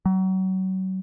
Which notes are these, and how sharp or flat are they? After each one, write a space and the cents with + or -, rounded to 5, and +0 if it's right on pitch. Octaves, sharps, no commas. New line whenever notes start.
F#3 +30